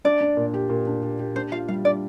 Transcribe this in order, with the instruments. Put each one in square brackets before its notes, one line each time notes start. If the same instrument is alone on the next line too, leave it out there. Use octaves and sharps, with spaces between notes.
[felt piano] D4 [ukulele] D5
[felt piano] D4
A#2
G4
A#2
D4
G4
G4
[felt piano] D4 [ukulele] C5
[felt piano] F4 [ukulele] F5
[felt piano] G3 [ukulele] F5
[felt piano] D4 [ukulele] D5